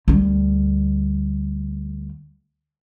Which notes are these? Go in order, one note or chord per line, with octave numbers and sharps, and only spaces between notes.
D2 G3